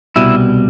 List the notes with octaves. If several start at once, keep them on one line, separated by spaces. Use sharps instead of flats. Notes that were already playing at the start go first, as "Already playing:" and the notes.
C2 B2 G3 E4